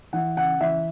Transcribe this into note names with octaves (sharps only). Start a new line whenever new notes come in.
E3 F#5
C#3 F#5
E3 E5